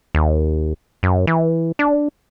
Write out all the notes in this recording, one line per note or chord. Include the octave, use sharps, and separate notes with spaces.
D#2
F#2
E3
D4